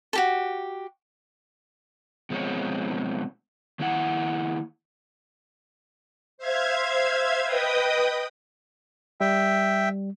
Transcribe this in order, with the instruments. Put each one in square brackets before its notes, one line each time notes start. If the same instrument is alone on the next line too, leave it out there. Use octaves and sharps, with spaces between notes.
[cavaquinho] F#4 G4 A4
[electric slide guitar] B2 F3 G#3 C4 C#5
D#3 A#3 E4 F#5
[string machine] C5 E5 F5 G#6
B4 D#5 G5 D#6
[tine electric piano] G3 [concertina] E5 G5